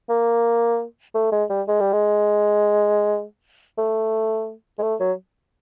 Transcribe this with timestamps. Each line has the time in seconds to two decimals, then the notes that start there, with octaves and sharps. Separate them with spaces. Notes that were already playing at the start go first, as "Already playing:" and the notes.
0.09 A#3
1.15 A3
1.32 G#3
1.50 G3
1.68 G#3
1.81 G3
1.93 G#3
3.78 A3
4.79 G#3
4.83 A3
5.00 F#3